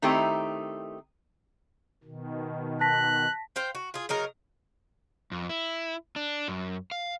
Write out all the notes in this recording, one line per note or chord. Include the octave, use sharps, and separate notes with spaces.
D#3 A3 C4 D#4 E4 G4
B2 D#3
A5 F#6 A#6 B6
C5 F5 G5
F#4
F4 G#4
C#3 F#3 D#4 A#4
F2
E4
D4
F#2
F5